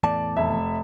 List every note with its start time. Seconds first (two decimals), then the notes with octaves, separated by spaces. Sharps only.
0.04 E2 A2 D5 A5
0.37 F1 E5